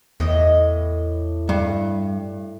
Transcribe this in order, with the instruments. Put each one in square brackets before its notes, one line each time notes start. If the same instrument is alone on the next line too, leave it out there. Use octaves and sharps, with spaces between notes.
[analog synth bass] E2 [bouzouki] A2 E3 D#5
[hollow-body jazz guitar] G2